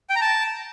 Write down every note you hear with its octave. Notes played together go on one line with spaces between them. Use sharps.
G5
A#5
A5